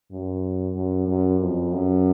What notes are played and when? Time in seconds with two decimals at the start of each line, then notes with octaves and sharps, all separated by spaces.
0.11 F#2
0.76 F#2
1.08 F#2
1.41 F2
1.72 F#2